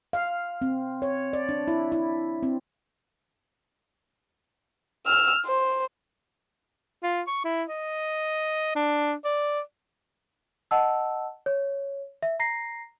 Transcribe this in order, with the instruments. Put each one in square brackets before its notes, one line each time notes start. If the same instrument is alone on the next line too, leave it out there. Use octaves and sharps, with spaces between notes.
[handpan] F5
C4
C#5
D5
D4
E4
E4
C4
[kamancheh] E6 F6
C5
[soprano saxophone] F4
C#6
E4
D#5
D4
D5
[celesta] D#5 F#5 A5 E6
C#5
E5
A#5 A#6 C7